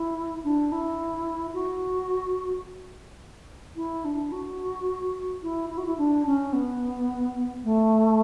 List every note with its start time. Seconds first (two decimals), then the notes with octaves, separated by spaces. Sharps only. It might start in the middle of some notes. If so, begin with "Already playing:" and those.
Already playing: E4
0.44 D4
0.72 E4
1.54 F#4
3.76 E4
4.04 D4
4.32 F#4
5.43 E4
5.70 E4
5.78 F#4
5.86 E4
5.98 D4
6.26 C#4
6.53 B3
7.64 A3